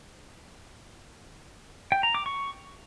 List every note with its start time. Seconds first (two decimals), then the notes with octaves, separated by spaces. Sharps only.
1.92 G5
2.03 A#5
2.15 D6
2.26 C#6